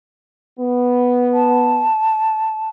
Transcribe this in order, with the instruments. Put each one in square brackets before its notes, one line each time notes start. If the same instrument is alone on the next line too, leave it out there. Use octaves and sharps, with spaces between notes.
[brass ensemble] B3
[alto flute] A5